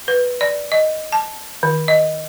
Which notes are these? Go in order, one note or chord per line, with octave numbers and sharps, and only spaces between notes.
B4
D5
D#5
A5
D#3
D#5